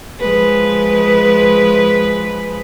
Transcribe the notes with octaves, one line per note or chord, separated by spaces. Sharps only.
F3 G#3 B4